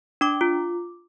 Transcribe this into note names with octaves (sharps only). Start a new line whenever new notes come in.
D4 D6
F4